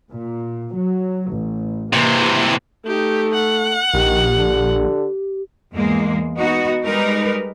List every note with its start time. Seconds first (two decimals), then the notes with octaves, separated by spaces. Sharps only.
0.11 A#2
0.75 F#3
1.32 A1
1.93 C3 E3 A#3
2.86 A3 D#4 G4
3.34 F#5
3.94 A#1 D#3 G4
4.38 D3
5.73 E2 G#2 G#3 A#3
6.38 B3 D#4 F#4
6.84 G3 G#3 D#4 A#4 B4